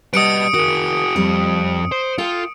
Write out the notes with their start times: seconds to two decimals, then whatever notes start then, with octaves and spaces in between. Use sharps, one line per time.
0.14 G3 B4 D#5 A5 D#6 C#7 D7
0.54 D#3 F#4 G#4
1.16 F2 G3
1.92 C5
2.18 F4 A4 G5